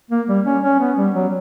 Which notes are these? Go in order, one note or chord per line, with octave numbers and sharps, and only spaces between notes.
A#3
G3
C#4
C#4
B3
G3
F#3